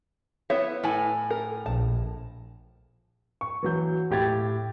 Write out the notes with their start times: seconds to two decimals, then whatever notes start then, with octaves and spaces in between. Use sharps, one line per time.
0.50 B3 E4 C#5 E5
0.84 A2 G#5
1.30 A#4
1.66 A#1 A5
3.41 C#6
3.63 E3 F#3 G6
4.11 A2 G4 G#6 A6